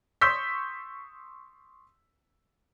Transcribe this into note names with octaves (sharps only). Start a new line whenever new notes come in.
C6 C#6 D#6 E6 G6 B6